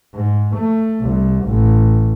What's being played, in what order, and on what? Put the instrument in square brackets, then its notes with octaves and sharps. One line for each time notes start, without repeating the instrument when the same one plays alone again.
[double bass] G#2
A3
C2
A1